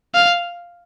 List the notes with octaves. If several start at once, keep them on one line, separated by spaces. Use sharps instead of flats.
F5